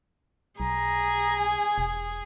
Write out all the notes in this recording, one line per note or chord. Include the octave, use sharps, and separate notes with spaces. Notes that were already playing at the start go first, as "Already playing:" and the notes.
B1 G#4 A#5
G#5
E1